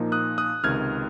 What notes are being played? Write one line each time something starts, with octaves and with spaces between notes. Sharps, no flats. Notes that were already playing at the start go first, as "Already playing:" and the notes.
Already playing: A#2 F3 A#3 D#4
D#6 F#6
D#6 F#6
C#2 C3 D#3 F6 G#6